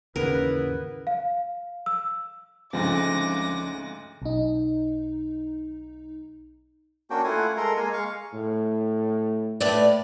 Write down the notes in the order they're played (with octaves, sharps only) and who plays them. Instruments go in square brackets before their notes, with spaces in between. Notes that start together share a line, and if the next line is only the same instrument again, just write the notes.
[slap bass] D#2 G#2 E3 [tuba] C#3 [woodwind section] B3 E4 B4 [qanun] A#4
[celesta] F5
E6
[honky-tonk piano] D2 G#2 [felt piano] C#3 [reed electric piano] F3 C4 [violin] D6 A#6
[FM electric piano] B1 D#4
[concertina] A#3 C#4 D4 F#4 G5
A3 E4 F4 F#5 G#5
G#3 A4 A#4 A#5 C6
G#3 A#3 G#5
G#3 F5 C#6
[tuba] A2
[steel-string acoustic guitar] A2 B4 D5